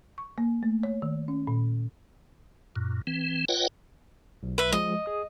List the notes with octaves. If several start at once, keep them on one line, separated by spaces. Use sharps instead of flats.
C#6
A#3
A3
C#5
D#3
C#4
A#2
F#2 A#2
E3 C4
F4 B4 C#5 D#5 F#5 G5
B1
B4 E5
F3 G#3 D#5
G#4 D#6